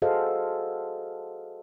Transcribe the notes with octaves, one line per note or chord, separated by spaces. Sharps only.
F#4 G#4 A4 C5 D#5 F5